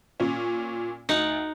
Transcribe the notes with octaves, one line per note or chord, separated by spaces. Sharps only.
A#2 C#4
D2 D#4 F#5